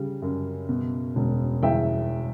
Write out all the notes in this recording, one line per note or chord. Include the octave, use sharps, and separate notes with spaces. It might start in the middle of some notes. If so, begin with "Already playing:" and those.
Already playing: C#3 G3
F#2
B2
E1
E2 E5 G5